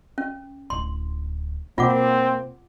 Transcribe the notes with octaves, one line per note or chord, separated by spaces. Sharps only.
C#4
D1 E4 C6
B2 A#3 C4 F4 F#5 D6